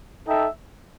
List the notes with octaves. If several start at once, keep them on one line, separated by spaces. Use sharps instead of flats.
D#4 A4 E5 G5